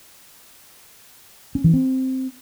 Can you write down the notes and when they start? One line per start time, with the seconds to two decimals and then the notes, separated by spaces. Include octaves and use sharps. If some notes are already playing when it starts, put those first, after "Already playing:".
1.55 C#4
1.64 E3
1.73 C4